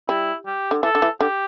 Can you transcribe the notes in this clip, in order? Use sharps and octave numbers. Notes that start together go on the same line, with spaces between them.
G3 E4
G4
D3
E3 A4
D3
E3
D3 G4